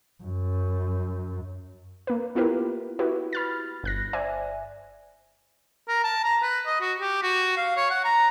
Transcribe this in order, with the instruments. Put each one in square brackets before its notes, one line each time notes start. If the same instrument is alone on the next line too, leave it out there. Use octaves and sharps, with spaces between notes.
[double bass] F#2
[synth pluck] A#3 B4
B3 E4 F4 G4 A#4 B4
E4 F#4 G4 B4
B5 F6 A6
G1 F#6 A#6
C5 D5 E5 G#5
[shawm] A#4
A5
A#5
B4
D#5
F#4
G4
F#4
F5
C#5
F#5
A#5